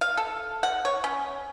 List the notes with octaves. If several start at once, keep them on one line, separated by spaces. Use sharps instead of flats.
F5
A4
F#5
C#5
C#4